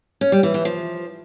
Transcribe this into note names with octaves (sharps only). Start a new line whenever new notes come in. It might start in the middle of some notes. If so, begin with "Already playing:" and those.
C#4
G3
E3
E3
F3